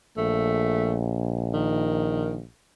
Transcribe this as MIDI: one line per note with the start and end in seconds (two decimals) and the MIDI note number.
0.17 2.44 34
0.17 1.01 57
1.53 2.37 51